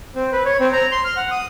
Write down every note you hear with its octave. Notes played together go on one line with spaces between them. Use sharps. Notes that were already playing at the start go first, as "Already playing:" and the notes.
C4
B4
C#5
C4
A#5
C6
F6
F#5
D#6